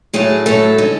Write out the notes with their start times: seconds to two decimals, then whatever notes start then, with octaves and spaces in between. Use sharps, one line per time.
0.13 A2 F#3 A3 G#4
0.46 A2 F#3 A3 A4
0.78 D3 G#3